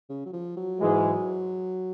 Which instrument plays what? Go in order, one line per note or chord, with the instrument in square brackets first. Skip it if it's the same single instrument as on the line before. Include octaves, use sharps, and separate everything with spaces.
[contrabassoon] C#3
F#3
F3
F#3
[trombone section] G#2 E3 G#3